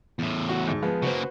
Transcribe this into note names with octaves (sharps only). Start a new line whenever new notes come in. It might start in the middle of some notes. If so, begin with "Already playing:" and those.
E2 A2
F#4
D2 G#2
F3 G#3 B3
C#3 A#3 F#4 B4 C5